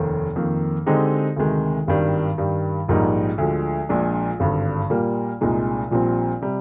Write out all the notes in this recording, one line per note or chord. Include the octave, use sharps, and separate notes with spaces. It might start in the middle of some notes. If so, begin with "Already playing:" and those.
Already playing: F1 D#2 D#3 A#3
F2 D#3 A#3
D3 G#3 C4 D#4 G4
D2 C3 D#3 G#3
G#1 G2 D#3 G3 D4
G2 D#3 G3
A#1 G#2 G3 A#3 D#4
D2 D3 F3 G#3
A#1 A#2 G#3 D4
G#1 G2 D3
A#2 G3 A#3
C2 A#2 G#3 D#4
A#1 A#2 G3 C4
C3 G3